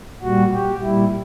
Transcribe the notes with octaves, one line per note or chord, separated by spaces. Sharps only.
A#2 G3 F#4
G4
A#2 G3 E4